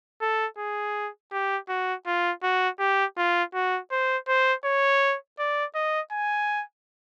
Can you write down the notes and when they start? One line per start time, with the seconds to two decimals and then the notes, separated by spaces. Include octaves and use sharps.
0.21 A4
0.58 G#4
1.32 G4
1.69 F#4
2.07 F4
2.43 F#4
2.80 G4
3.17 F4
3.54 F#4
3.91 C5
4.28 C5
4.65 C#5
5.39 D5
5.75 D#5
6.12 G#5